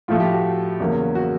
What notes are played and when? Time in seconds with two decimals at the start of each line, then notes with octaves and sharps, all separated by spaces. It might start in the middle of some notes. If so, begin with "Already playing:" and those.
0.08 A2 F3 A3 F4
0.20 G4
0.32 F#4
0.80 E2 C#3 F#3 A#3 C#4
1.15 F#4